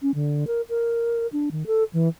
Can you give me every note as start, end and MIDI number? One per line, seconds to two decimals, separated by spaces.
0.02 0.11 61
0.15 0.44 50
0.47 0.61 70
0.69 1.27 70
1.33 1.49 62
1.52 1.67 51
1.67 1.84 69
1.93 2.08 52